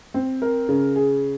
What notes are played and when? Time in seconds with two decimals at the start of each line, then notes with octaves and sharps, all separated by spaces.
0.14 C4
0.42 A#4
0.69 C#3
0.96 G#4